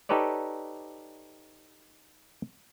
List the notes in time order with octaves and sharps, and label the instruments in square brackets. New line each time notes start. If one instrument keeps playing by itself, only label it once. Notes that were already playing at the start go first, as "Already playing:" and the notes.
[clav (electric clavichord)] D#4 G4 A4 B4 C#5 D5